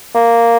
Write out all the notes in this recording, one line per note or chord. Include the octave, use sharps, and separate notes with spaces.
A#3